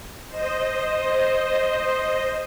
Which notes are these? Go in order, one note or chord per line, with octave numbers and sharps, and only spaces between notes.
C5 D#5